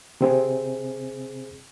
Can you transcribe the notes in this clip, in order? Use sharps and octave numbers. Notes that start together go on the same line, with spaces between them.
C3 C4 G#4